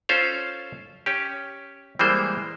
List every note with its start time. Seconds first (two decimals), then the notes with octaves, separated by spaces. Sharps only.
0.09 C#4 F4 A4 C5 F5
1.06 C#4 G4
1.99 E3 G3 G#3 A#3 C5